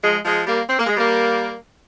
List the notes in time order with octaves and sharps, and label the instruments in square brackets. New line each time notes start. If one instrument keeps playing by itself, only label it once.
[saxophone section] F3 G#3
F3 G#3
G3 A#3
C4
A#3
G#3
G3 A#3